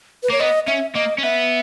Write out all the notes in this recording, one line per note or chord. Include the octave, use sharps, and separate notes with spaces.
B4
A#3 C#5
B3 D#5
C#4 E5
A#3 D#5
C#4
B3 E5